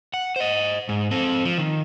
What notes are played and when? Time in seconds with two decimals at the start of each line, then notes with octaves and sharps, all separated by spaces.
0.14 F#5
0.36 C5 D#5
0.89 G#2
1.11 C4 A4
1.45 F3
1.58 D#3